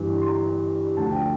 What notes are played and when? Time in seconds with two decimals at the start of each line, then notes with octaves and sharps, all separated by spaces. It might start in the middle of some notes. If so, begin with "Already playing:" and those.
Already playing: G1 G2 E3 G3
0.21 C6
0.28 A#5
0.97 D2 D3 F3 A5
1.11 G5